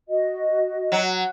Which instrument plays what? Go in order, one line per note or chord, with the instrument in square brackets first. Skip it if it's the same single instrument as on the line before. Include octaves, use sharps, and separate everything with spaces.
[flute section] F#4 D#5
[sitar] F#3